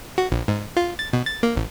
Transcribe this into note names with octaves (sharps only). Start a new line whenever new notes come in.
F#4
A#1
G#2
F4
A6
B2
A6
A#3
A1